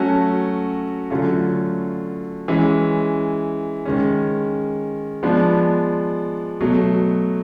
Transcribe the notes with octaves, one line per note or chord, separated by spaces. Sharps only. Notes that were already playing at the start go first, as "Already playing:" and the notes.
Already playing: F#3 A3 C#4 F#4 A4
D3 F#3 A3 C#4 F4
E3 G#3 C#4
D#3 G#3 C#4
F3 G#3 B3 D4
B2 F#3 A3